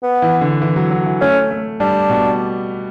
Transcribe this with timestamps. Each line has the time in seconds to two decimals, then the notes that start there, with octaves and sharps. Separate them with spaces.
0.03 B3
0.22 E3
0.41 D3
0.62 E3
0.76 F#3
0.91 F#3
1.06 E3
1.21 A3 C#4
1.51 A3
1.80 G3 D4
2.10 B2